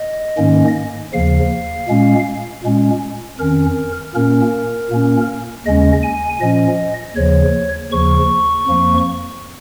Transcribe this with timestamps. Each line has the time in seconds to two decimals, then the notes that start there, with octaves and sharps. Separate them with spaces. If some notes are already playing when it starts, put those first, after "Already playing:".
Already playing: D#5
0.38 G#2 D#3 A#3 C#4
1.13 D#2 C#3 F3 F5
1.88 A#2 G#3 C#4
2.64 A#2 G#3 C#4
3.39 F2 D#3 C#4 A#4
4.15 A#2 A#3 C#4 A#4
4.90 A#2 A#3 C#4
5.66 D#2 C#3 G#3 C#4 D#5
6.03 G#5
6.41 A#2 F3 C#4 D#5
7.16 D#2 C#3 F3 C#5
7.92 D#2 C#3 F3 C#6
8.67 F2 F3 A#3